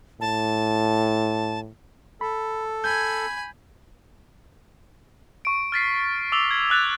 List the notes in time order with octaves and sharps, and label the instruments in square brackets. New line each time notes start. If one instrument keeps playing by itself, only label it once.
[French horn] A2 [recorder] A5
[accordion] A4 [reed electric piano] B5
[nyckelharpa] G#5 B5 [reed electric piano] G6 G#6
[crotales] C#6 D7
F6 A6 B6 C7
D6 E6 F7 G7
G#6
E6 F#6 A6 F7